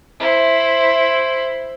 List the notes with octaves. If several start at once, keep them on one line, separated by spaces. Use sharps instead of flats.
E4 C5